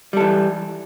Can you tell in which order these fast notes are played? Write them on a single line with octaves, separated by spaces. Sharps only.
G3 A4 E3